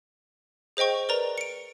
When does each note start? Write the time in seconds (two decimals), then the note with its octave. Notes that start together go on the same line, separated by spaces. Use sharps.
0.77 G#4 C5 D#5 G5 C#6
1.09 A#4 B4 D5 A#5
1.38 C#7 D7